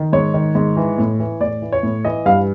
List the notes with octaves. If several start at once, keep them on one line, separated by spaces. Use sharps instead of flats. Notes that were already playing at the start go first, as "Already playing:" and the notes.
Already playing: D#3
G#2 C#5
D#3
G#2
E3
A2
E3
A2 D5
E3
C#5
A2
E3 D#5
G2 F5